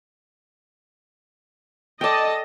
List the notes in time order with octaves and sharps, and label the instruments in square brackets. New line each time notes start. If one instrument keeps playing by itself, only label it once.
[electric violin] A4 A5 [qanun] D5 G5 [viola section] D#5